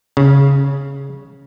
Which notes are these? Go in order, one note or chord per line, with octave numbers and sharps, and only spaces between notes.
C#3